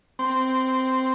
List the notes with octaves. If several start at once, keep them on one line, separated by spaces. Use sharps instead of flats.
C4